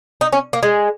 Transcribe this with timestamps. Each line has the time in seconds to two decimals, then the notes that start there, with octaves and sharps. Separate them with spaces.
0.21 D#4
0.32 C#4
0.53 A#3
0.63 G#3